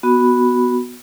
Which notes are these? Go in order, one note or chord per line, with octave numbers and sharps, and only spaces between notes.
B3 F#4 B5